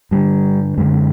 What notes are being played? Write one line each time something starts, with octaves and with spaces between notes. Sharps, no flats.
G2 D3 G3
F#2 D3 G#3